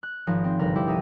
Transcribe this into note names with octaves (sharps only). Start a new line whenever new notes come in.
F#6
G#1 F3 D#4 A#6
C4
G1 C2 A#4 B4 A#6
F3 G3 E4 G4
C2 D#4 E5 D#6